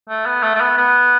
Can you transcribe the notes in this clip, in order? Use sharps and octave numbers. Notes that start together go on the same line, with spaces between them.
A3
B3
A3
A3
B3
B3